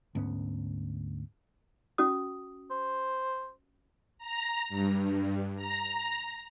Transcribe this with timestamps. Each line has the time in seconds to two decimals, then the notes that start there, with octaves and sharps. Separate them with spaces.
0.15 D2 G#2 B3 C#4
1.98 C#4 F#4 D#6
2.71 C5
4.18 A#5
4.69 G2
5.56 A#5